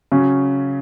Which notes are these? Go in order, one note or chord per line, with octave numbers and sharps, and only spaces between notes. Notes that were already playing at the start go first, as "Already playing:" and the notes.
C#3 F#3 C#4